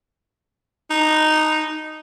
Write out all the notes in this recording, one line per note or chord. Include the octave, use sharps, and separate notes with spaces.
D#4